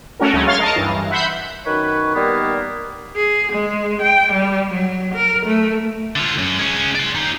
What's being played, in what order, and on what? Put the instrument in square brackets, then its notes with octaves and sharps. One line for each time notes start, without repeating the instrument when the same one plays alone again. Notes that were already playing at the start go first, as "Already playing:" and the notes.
[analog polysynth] A3 C#4 F#4 A#4
D2 F#3 G#3 A3 C#4
C#5 F5 C6 F6 A6
A#4 D#5 F5 A5 A#5
G2 E3
E5 F#5 B5 C6 G6
[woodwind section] F#2 D#3 B4 C#5
D#3 G3 A#3 B3
[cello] G#4
G#3
G5
G3
F#3
A#4
A3
[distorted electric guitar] D3 F4
F#2
G#3 C#4
D5 C6
D#4 G4